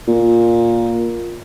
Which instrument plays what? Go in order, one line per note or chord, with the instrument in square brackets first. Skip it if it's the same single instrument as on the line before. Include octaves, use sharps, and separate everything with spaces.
[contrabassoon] A#2